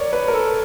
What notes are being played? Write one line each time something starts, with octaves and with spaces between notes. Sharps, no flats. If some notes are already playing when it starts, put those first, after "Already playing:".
Already playing: A#4 C#5 D5
B4
A#4
A4